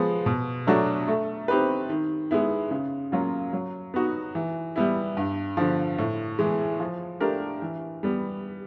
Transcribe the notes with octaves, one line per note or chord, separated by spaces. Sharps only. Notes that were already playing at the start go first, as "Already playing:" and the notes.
Already playing: F3 G#3 B3
B2
F#3 A3 D4 F#4
A3
C4 D#4 G4 B4
D#3
G#3 B3 E4
C#3
F#3 A#3 C#4 F4
F#3
B3 D#4 F#4
E3
G3 B3 E4
G2
D3 F3
A2
E3 G#3
F3
A3 D4 G4 A#4
E3
G3 B3